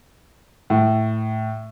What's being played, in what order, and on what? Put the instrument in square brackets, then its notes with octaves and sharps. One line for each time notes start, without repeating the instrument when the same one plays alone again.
[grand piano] A2